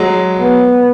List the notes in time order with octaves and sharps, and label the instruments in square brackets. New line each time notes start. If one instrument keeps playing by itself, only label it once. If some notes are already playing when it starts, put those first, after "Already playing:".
Already playing: [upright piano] F#3 G#3
[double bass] B3